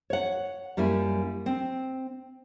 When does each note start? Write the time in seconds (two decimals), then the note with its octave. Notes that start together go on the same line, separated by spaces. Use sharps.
0.10 C#5 F#5
0.77 F#2 G3 A#3 E4 G#5
1.46 C4